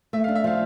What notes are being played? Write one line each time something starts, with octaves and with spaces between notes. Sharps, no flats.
A3 E5
F5
D4
E5
F3 F5